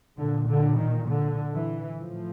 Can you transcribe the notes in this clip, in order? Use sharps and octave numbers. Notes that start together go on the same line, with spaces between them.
A#2 D3
D3
D#3
D3
E3
A2 F3